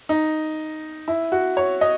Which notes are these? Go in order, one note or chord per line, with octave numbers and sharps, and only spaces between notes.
D#4
E4
F#4
C#5
D#5